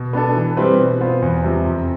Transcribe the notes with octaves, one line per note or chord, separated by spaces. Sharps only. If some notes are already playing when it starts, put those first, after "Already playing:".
Already playing: B2
B3 D4 A4
E3
G3 C4 E4 B4
B2
B3 F4 C5
E2
C3 F3
F2